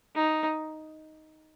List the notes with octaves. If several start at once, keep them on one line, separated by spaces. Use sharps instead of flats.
D#4